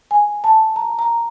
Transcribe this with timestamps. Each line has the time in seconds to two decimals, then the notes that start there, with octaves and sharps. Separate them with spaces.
0.11 G#5
0.44 A5
0.76 A#5
0.99 A#5